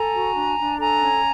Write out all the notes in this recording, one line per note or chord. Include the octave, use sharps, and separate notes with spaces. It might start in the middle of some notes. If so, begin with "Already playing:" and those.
Already playing: A4 G#5 A#5
F#4
D4
D4
A4 G#5 A#5
C#4